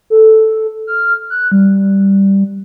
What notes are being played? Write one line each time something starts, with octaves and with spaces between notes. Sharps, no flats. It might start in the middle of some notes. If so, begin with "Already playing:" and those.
A4
F6
F#6
G3